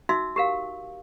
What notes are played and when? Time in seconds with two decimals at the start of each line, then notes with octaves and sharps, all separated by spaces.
0.09 D#4 F#4 E5 E6
0.36 G4 A#4 F5